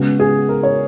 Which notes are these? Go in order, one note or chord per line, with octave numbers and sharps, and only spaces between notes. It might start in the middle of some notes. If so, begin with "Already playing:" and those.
Already playing: C#3 G#3 B3 F#4
G#4
A#4
C#5